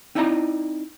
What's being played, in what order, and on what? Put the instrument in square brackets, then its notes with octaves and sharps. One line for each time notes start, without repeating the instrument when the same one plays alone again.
[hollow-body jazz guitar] C4 D#4 E4 D5 A5 A#5